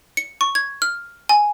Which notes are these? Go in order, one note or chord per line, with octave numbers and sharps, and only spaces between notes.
C#7
C#6
G#6
F6
G#5